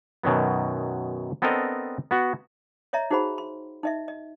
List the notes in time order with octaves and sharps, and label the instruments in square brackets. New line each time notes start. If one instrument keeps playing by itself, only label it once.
[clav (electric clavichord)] F#2 B2 D#3 F#3 B3
B3 C4 D4 A4 A#4 D#5
B3 F#4
[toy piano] C#5 D#5 E5 A#5
D#4 F#4 G#4 C5 F#5 B5
C6
D#4 D#5 E5
D#5